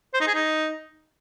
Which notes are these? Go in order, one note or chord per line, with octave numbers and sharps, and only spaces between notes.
C5
D#4
G#4
D#4